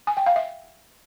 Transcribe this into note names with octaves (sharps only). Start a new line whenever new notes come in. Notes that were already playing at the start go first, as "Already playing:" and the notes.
G#5
G5
F5
E5